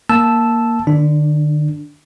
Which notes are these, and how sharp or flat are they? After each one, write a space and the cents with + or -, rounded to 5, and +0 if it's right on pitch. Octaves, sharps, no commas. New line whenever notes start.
A#3 +0 A5 -5 E6 +0
D3 +45 D4 +0